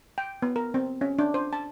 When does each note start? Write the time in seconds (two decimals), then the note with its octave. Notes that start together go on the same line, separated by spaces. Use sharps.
0.18 G5
0.42 B3
0.56 A#4
0.74 C4
1.01 C#4
1.19 D4
1.34 C5
1.53 A5